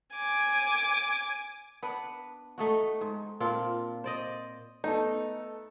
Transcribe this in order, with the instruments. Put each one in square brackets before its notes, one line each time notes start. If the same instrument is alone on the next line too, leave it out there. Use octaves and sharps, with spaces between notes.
[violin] G#5 D6
[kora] B3 D4 B4
A3 D#4 F#4
G#2
A#2 C4 D4 F4
C5 D5 D#5
[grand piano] A3 B3 A4 [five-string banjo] D#4